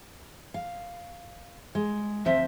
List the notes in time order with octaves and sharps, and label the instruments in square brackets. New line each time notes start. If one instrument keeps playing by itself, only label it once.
[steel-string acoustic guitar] F5
G#3
[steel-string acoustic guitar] D2 F3 C4 [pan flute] E5